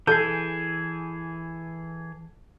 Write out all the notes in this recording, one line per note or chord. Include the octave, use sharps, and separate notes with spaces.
E3 G#4 A4 G6